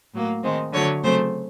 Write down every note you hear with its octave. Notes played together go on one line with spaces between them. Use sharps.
A2 F#3 A#3
D#3 G#3 C4
D3 F#3 A3 C#5
C#3 F#3 A3 C4 C5